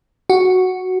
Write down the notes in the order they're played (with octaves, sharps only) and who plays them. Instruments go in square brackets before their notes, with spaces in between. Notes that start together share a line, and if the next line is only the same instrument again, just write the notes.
[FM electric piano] F#4